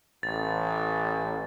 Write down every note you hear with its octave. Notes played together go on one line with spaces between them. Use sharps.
A1 A6